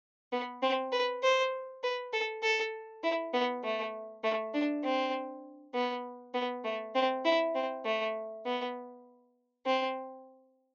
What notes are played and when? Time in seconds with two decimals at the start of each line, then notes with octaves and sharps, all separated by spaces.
0.32 B3
0.62 C4
0.92 B4
1.23 C5
1.83 B4
2.13 A4
2.43 A4
3.03 E4
3.33 B3
3.64 A3
4.24 A3
4.54 D4
4.84 C4
5.74 B3
6.34 B3
6.64 A3
6.95 C4
7.25 E4
7.55 C4
7.85 A3
8.45 B3
9.66 C4